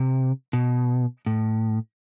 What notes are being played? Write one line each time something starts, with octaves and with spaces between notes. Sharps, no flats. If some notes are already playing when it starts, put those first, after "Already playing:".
Already playing: C3
B2
A2